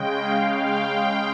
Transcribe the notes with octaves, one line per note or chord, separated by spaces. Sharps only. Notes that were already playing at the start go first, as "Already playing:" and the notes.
Already playing: C#3 G#3 G5
F5
G5